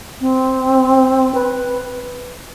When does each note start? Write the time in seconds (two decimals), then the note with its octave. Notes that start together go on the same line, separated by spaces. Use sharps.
0.21 C4
1.34 B4